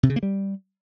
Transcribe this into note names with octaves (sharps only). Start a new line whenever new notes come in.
C3
C#3
A#3
G3